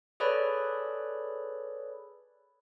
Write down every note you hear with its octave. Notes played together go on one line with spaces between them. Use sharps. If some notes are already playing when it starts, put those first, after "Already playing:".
G#4 A4 B4 C#5 D5 B5